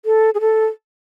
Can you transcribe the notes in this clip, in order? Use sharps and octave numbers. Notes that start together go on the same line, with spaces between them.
A4
G#4
A4